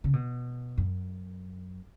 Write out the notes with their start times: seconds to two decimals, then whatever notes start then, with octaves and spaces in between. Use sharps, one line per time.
0.04 C#3
0.13 B2
0.77 F#2